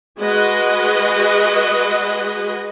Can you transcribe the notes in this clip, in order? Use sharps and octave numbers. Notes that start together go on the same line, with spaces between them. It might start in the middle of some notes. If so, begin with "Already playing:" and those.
G#3 F#4 G#4 B4 D#5